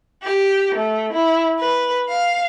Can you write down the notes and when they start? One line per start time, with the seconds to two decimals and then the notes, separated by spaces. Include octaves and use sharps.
0.23 G4
0.75 A3
1.13 E4
1.59 B4
2.09 F5